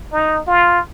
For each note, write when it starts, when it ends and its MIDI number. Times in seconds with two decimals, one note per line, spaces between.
0.13 0.40 63
0.47 0.80 65